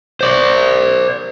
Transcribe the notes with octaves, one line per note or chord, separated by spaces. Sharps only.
C5 D5